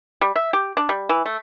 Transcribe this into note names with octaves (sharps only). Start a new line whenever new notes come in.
G3
E5
G4
D4
G3
E3
A3